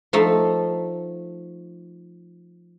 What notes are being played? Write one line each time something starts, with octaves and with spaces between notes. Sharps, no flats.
F3 A3 D#4